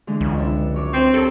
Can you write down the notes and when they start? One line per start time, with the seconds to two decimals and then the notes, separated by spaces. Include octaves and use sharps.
0.07 D3 E3 G#3
0.21 C#2
0.37 F2 D3 E5
0.74 F#2 C#5 D6
0.93 C4
1.14 G4 A4 A#4 C#5